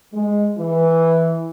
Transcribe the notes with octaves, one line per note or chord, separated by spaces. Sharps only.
G#3
E3